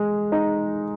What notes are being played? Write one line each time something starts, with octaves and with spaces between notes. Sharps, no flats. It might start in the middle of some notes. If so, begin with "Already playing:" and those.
Already playing: G#3
D#4